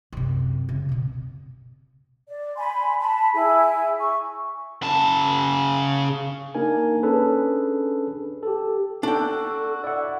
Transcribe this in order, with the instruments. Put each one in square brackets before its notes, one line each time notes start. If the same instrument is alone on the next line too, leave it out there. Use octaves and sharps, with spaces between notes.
[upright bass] F#2 C3
C#3
B2 C4
[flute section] D5
G#5 B5 C6
A5 B5
E4 G#4 G#5
C#6
[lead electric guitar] C#3 A5
[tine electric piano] A#3 D4 D#4 A#4 G#5
C#4 D4 G#4 A4 B4
G4 A4
[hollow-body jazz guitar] D4 G5 [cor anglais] F#4 [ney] A4
[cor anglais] E4 [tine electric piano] D5 F#5